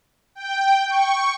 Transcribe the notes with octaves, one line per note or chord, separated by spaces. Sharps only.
G5
C#6